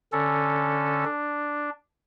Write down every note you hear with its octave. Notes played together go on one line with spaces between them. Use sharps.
D3 C#4 A4
D4